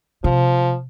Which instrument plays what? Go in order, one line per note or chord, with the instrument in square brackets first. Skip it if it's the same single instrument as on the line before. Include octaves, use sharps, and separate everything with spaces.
[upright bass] C3 [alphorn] F3